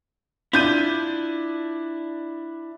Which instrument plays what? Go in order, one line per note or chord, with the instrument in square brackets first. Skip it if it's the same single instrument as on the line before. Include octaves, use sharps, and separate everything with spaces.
[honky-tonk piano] D4 G6 D#7 [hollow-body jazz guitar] E4 F4